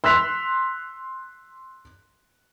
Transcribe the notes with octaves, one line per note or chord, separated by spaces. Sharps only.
C6 E6 F#6 B6 F7